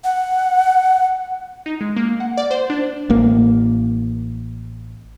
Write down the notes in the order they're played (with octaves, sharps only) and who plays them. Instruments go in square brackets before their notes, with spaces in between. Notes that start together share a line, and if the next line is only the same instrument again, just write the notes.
[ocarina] F#5
[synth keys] D#4
G#3
A#3
F#5
D5
C5
D4
[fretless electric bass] A1 A#3